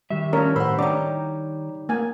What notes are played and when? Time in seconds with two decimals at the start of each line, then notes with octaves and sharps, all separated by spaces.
0.10 D#3 G3 G4 E5
0.33 F3 C#4 D4 A#4 C#5
0.56 A2 C5 F#5 B5 E6
0.79 G3 D4 D#4 C#5 A#5 D6
1.89 A#3 G#5